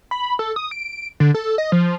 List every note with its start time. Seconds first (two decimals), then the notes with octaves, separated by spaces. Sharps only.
0.11 B5
0.39 A4
0.56 D#6
0.71 D7
1.20 D3
1.34 A4
1.58 D#5
1.72 F3